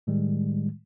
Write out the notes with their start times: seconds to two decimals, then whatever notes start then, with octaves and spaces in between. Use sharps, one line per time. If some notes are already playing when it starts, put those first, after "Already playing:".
0.07 A2 D#3 G3 G#3